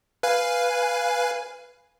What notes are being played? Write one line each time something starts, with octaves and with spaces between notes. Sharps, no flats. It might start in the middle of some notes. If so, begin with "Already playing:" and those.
B4 F5 G#5